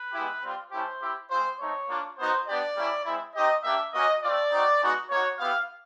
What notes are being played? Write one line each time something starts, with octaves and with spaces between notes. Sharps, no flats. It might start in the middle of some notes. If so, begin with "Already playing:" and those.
Already playing: B4
G#3 B3 E4 G4
G3 C4 F4
A3 C#4 E4 G4 C5
C4 E4 G4
G#3 C4 F4 C5
A3 C4 D#4 C#5
A#3 D4 F4
B3 D#4 F#4 C5
B3 D4 G4 D5
G3 A#3 C#4 E4
G#3 C4 E4
C4 D#4 G4 D#5
A#3 D4 G4 E5
A#3 C#4 F#4 D#5
A3 C4 F4 D5
C4 D#4 F#4
G#3 B3 D#4 F#4
A#3 D#4 F#4 C#5
B3 E4 G4 F5